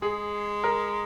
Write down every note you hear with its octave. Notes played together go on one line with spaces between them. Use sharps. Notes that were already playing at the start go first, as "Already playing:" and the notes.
G#3 G#4
A#4